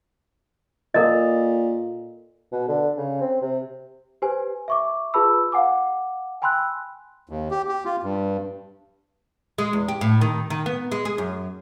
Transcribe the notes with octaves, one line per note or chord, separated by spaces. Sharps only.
A#2 A4 A#4 D#5
B2
D3
C#3
C4
C3
G4 B4 C5 G#5
E5 C#6 D6
F4 G#4 B4 A5 B5 E6
F5 F#5 G#5 D6
G5 G#5 B5 C6 E6 F#6
D#2
G4
G4
F4
G2
G#3
E2
G4
A2
D#3
D#3
B3
G#3
G#4
F#2